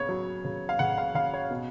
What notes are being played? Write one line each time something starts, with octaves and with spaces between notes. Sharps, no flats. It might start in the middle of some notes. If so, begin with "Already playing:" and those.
Already playing: C#3 B3 C#5
F#3
C#3
F5
C#3 F#5
F5
C#3 F5
C#5
B2